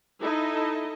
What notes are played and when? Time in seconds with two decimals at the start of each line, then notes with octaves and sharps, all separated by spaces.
0.20 D#4 E4 A4 D#5